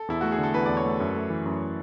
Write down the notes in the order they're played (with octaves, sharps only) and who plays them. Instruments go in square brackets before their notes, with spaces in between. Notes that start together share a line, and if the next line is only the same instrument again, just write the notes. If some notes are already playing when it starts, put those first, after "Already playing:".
Already playing: [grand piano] A4
[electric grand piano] E2 [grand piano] E4
[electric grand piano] A3 [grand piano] F#4
[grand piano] G#4
[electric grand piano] D3 [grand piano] A4
[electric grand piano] E2 [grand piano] B4
[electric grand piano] E2 [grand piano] D5
[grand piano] C#5
[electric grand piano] A3
F#2
A3
E3
F#2